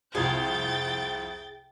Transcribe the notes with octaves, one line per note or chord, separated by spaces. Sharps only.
C2 F2 G#4 G5 G6 A6